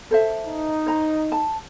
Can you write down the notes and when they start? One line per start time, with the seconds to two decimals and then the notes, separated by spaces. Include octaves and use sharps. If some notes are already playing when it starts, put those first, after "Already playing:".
0.11 A4 C5 E5
0.46 D#4
0.86 C5 A#5
1.32 A5